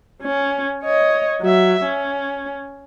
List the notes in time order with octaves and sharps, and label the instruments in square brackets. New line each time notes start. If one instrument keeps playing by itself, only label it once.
[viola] C#4
C#5 D#5
F#3 E5
C#4